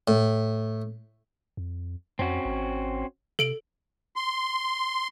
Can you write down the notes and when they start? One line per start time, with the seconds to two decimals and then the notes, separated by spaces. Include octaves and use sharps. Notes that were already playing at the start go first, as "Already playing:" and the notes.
0.08 A2
1.57 F2
2.19 F2 C4 C#4 F#4
2.45 G#1
3.39 C3 A4 D7 F#7
4.16 C6